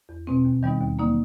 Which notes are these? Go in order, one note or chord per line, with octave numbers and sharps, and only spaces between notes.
E2
B2 G#3 C4
D#2
D#3 G3 B3 D#4
D#2
D3 F#3 A#3 D#4